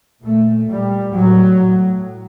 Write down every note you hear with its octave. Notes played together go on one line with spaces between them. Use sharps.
A#2 A3
A#2 G3
A2 F#3
A2